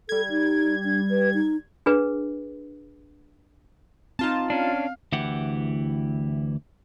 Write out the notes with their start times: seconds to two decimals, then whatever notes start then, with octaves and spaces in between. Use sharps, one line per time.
0.09 G3 A4 G#6
0.30 D#4
0.85 D4
1.10 B4
1.34 D#4
1.86 D4 G#4 B4
4.19 C4 D#4 F4 A5
4.50 C#4 D4 F5
5.12 D2 E3 E4 G4 F#5